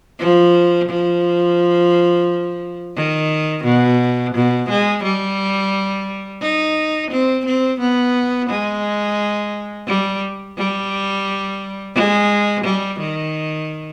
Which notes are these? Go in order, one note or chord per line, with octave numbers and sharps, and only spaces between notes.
F3
F3
D#3
B2
B2
G#3
G3
D#4
C4
C4
B3
G#3
G3
G3
G#3
G3
D#3